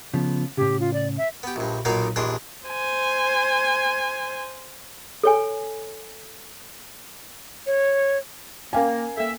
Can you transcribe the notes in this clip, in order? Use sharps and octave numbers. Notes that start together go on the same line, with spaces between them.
C#3 F3 B3
A2 C#3 G4
F4
D5
E5
B3 G4
A#1 G2
B1 A#2 A#3 B3 D#4 F5
A#1 D#2 E3 D4 G#4 C6
C5 G#5
A4 C#5 G#5
C#5
A#3 C#4 A#4 F5 G5 G#5
A#3 A4 E5